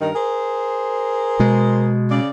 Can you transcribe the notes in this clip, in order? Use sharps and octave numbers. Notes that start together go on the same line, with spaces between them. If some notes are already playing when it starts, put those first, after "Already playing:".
G2 D#3 A#4
G#4 A#4 C5
B2 G#3
C#3 D5